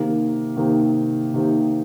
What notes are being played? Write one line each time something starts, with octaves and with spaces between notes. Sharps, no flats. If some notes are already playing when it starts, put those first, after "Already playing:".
Already playing: C3 D#3 A#3
C3 D#3 A#3
C3 D#3 A#3